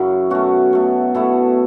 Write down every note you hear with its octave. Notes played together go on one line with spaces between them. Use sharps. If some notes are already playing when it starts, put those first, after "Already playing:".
Already playing: F#2 C#3 F#3 C#4 E4 F#4
B2 A3 C#4 F#4
B2 A3
B2 A3 E4 A4